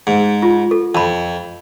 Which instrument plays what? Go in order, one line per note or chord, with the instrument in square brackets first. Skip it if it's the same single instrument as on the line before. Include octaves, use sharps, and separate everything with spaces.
[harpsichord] G#2
[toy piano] F4
A4
[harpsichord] F2 [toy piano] A5 B5